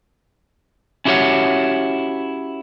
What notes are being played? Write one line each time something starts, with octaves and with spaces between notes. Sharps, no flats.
C#4 E4 F#4 G4 C#5 F#5